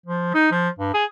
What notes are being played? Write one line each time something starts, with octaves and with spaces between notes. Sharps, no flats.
F3
D#4
F3
G2
G#4